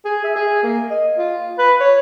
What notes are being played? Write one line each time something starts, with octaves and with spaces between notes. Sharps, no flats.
G#4
E5
G#4
A#3
D#5
F4
B4
C#5